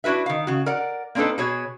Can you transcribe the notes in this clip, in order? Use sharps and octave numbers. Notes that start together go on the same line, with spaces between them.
D4 E4 F#4 B4 E5
D#3 F5
C#3 F#4
A#4 D5 F#5
A#3 C4 D4 D#4 A4 B4
B2 F#4 G#4 C#5